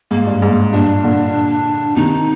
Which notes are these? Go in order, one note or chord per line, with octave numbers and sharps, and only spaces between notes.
G#2 A#3
G2
G#2
G2 A#2 D4
A#2 D3
C3 D#3 D#4